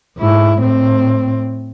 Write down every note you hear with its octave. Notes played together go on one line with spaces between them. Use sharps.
G#2 E4
A2 C4